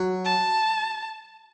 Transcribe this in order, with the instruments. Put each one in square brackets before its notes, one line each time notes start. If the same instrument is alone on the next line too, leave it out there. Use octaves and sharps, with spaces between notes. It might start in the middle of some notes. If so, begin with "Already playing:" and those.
Already playing: [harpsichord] F#3
[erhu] A5